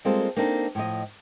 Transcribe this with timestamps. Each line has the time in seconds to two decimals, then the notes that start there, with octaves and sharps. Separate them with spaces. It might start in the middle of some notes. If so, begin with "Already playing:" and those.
0.05 G3 G#3 A#3 C4 F4 A4
0.37 A#3 C4 D4 D#4 A4
0.75 A2 F3 D#5